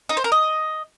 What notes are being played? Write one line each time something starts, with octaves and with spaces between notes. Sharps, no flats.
D#4
C5
A#4
D#5